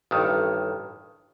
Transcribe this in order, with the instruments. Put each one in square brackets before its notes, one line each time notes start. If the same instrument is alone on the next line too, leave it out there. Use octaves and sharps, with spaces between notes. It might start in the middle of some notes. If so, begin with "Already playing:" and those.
[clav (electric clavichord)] A1 G2 D#3